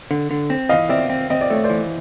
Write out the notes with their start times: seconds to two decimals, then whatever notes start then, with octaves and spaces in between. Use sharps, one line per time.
0.11 D3
0.31 D3
0.50 C4
0.69 E3 D#5 F5
0.89 C4 D5 E5
1.10 C4
1.30 C4 D#5
1.41 D5
1.50 A3 C#5
1.64 C5 D5
1.70 E3